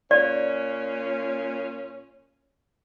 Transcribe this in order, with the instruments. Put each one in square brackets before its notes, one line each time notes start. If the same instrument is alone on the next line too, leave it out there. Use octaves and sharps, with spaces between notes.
[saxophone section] A#2 C#4 [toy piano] D5